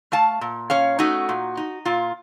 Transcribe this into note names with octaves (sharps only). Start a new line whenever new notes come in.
A3 F5 A5
A#2
C#4 C#5 F5
A3 D#4 F#4
A#2
D#4
A#2 F4